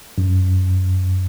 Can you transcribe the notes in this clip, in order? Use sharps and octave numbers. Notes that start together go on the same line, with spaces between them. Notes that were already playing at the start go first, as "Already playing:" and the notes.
F#2